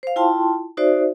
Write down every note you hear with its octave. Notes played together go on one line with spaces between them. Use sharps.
C5 F5
E4 F4 G5 A5 C6
D#4 F#4 C5 D5 E5